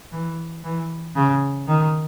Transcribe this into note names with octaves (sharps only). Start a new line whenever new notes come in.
E3
E3
C#3
D#3